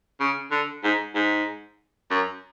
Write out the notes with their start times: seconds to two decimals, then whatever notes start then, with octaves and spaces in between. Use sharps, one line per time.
0.20 C#3
0.51 D3
0.83 G#2
1.15 G#2
2.11 F#2